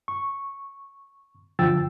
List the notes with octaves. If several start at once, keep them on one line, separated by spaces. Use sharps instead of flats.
C#6
D3 F3 G5 E6 A6